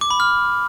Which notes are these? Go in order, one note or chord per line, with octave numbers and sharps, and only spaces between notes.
D6
B5
F6